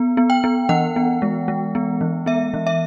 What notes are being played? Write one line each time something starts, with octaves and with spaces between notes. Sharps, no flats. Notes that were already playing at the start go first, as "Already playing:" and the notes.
Already playing: B3
B3
G5
B3
E3 F#5
B3
G#3
G#3
B3
E3
B3 E5
E3
E5